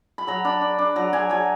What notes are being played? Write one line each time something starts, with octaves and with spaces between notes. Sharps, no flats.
B5
F#3 A#5
D4 B5
D4
D4
F#3 A#5
D4 G#5
F#3 G#5